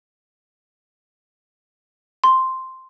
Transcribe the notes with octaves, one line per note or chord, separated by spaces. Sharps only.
C6